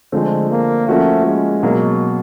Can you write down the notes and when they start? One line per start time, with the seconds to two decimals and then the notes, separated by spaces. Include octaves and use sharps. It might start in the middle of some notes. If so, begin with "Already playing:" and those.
0.12 D3 F3 G#3 A3 C4
0.51 A#3
0.88 F3 A3 A#3 C#4 F#4
1.26 G#3
1.63 B2 F#3 A#3